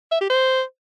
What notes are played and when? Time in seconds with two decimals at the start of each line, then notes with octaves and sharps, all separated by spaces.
0.12 E5
0.21 G4
0.30 C5